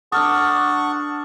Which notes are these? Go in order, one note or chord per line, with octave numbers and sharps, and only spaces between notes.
D4 A4 F#5 C#6 D#6 F6